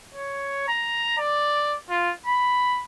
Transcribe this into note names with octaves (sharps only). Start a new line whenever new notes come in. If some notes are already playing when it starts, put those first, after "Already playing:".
C#5
A#5
D5
F4
B5